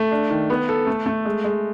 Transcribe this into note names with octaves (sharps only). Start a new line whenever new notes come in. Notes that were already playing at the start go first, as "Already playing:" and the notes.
Already playing: A3
D4
D#3
B3
A4
A3
A3
G#3
G#3